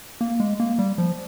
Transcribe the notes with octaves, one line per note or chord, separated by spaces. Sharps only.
A#3
G#3
A#3
G3
F3